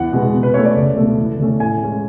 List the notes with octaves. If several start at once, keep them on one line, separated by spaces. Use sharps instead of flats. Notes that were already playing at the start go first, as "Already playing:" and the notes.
Already playing: E2 F#5
B2 G#3 B3
B2
B4
A3 C#4 C#5
D5
C#2
B2 A3
E2
D3 A3 C#4
A2 G#5
G#3 C#4